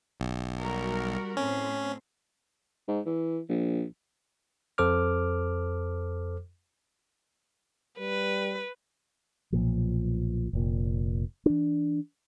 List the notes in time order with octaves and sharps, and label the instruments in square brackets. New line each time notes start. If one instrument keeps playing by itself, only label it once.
[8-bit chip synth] B1
[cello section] G3 F#4 A#4
[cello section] A2 C4 [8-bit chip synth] C#4
[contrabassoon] G#2
E3
A#1
[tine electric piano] F2 A4 C5 D6 F6
[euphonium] G3 [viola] B4
[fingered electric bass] B1 A#2 F3
F1 A#2
E3 D4